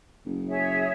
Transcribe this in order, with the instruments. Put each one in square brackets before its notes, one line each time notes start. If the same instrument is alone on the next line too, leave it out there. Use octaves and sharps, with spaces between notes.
[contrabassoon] F#1
[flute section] G#4 C#5 E5